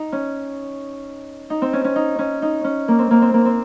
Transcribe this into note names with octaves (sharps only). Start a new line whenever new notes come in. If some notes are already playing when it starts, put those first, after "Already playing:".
Already playing: D#4
C#4
D#4
C4
C#4
C#4
D#4
C#4
D#4
C#4
A#3
C4
A#3
C4
A#3
C4